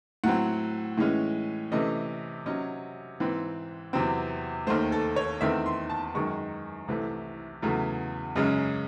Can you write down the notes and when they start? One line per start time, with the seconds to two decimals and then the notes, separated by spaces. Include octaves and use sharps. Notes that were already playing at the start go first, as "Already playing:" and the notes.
0.24 A2 F#3 C4 F#5
0.97 A2 E3 G#3 C#4
1.72 C3 E3 A3 C#4 D#5
2.46 C3 F#3 C#4 D#5
3.20 G#2 E3 C4
3.93 E2 C3 F#3 C4
4.67 D#2 D#3 A3 C5
4.92 A4
5.16 C#5
5.41 E2 D#3 A3 C4 E5
5.66 C6
5.90 A5
6.15 F#2 D#3 G#3 C#6
6.88 C2 C3 E3 A3
7.62 E2 C#3 F#3 A3
8.36 F#2 C#3 G#3 C#4